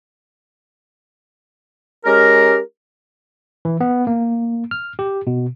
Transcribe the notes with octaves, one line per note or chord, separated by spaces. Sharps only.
G#3 C#4 G4 A#4
E3
B3
A#3
F6
G4
B2